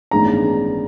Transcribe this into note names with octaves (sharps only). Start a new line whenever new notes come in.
A1 G2 D#3 G#3 B3 A#5